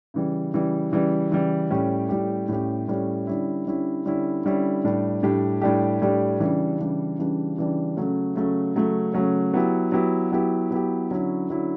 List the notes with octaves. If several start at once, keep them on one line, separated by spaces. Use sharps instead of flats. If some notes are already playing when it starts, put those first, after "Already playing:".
C#3 E3 G3
C#3 E3 G3
C#3 E3 G3
C#3 E3 G3
A2 G3 C#4 G4
A2 G3 C#4 G4
A2 G3 C#4 G4
A2 G3 C#4 G4
D3 G3 C#4 E4
D3 G3 C#4 E4
D3 G3 C#4 E4
D3 G3 C#4 E4
A2 G3 D4 G4
A2 G3 D4 G4
A2 G3 D4 G4
A2 G3 D4 G4
C#3 E3 G3 D4
C#3 E3 G3 D4
C#3 E3 G3 D4
C#3 E3 G3 D4
C#3 F#3 A3 C#4
C#3 F#3 A3 C#4
C#3 F#3 A3 C#4
C#3 F#3 A3 C#4
F#3 B3 E4 G4
F#3 B3 E4 G4
F#3 B3 E4 G4
F#3 B3 E4 G4
D3 F#3 C#4 E4
D3 F#3 C#4 E4